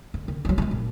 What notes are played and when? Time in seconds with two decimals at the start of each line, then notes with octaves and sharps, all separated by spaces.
0.14 D2
0.28 D3
0.45 F#3 G3
0.58 F#3 G#3
0.71 A#2